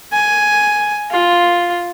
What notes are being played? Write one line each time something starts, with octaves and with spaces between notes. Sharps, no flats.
G#5
F4